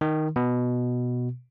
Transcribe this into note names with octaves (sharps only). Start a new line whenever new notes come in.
D#3
B2